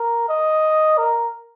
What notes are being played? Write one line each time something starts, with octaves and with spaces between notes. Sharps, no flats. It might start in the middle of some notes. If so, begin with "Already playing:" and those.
Already playing: A#4
D#5
A#4